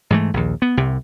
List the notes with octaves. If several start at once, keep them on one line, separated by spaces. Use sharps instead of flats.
G#2 E3 A3
A#1 D#2
B3
C2 C3